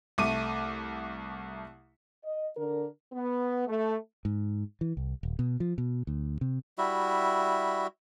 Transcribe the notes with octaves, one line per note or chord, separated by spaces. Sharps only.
C2 A3 D6 D#7
D#5
D3 D4 A#4
B3
A3
G#2
E3
C2
D#1
B2
F3
B2
D2
C3
G3 E4 F#4 E5